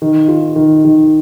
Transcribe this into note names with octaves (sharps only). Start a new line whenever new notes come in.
D#3
F4
D#3
D#3